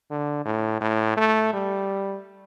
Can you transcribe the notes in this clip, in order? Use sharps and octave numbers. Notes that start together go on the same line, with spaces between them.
D3
A2
A2
A3
G3